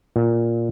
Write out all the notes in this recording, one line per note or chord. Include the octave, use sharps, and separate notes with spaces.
A#2